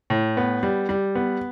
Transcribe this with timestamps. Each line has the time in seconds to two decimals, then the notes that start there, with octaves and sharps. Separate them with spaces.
0.10 A2
0.37 B3
0.63 G3
0.89 G3
1.15 B3